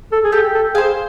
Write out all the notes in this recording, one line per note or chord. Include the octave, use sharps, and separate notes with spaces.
A4
G#4
G4 A4
A4
G#4 C5 F5